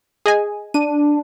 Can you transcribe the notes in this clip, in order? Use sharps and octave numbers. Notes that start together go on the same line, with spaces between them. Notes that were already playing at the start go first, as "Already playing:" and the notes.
G#4 D#5 G#5
D4 D#7